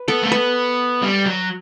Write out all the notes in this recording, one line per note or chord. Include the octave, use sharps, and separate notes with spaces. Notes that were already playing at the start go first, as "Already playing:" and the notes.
Already playing: B4
B3 A4
A3
B3 B4
G3
F#3